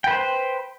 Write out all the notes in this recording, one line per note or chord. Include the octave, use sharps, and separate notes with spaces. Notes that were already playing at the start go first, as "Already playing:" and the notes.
B4 C5 G5